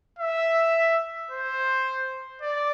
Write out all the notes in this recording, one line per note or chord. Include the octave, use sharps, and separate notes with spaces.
E5
C5
D5